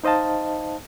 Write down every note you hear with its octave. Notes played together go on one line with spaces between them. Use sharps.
D#4 C5 D#5 F5 A5